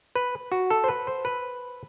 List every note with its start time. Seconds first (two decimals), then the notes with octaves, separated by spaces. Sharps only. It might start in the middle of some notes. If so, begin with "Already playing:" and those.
0.16 B4
0.52 F#4
0.70 A4
0.84 C5
0.88 B4
1.07 C5
1.25 B4